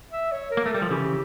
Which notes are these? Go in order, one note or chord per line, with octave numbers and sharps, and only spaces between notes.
E5
C#5
A#4
A#3
A3
G3 A4
F3
C#3 E3 G4